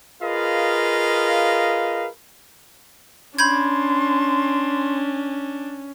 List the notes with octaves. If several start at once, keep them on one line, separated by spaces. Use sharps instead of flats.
F4 G#4 A#4 B4 D#5 F5
C#4 D4 B5 C6 G6 G#6